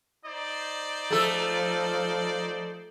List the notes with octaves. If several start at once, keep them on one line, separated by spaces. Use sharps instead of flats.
D#4 C5 D5
F3 A3 A4